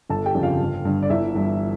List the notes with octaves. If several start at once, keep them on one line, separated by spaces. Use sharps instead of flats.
G1 A4 A5
G4 G5
F2 C#3
F4 F5
G1
G2 D3
D5
G1 E4 E5
G2 E3